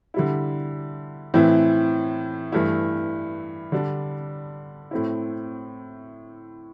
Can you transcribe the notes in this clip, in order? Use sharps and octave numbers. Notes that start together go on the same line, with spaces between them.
D3 G3 E4
A2 E3 C4 E4
G2 E3 A3 E4
D3 G3 D4
A2 A3 C4 E4